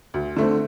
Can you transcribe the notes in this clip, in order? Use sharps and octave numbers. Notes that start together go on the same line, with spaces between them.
D2
D3 A3 C4